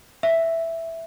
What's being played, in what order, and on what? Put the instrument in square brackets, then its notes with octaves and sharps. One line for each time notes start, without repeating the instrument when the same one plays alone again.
[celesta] E5